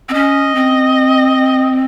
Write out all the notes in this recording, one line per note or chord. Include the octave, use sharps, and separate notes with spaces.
C4
C#4 D#5
C4